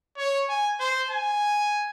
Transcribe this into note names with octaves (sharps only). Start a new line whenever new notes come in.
C#5
G#5
C5
G#5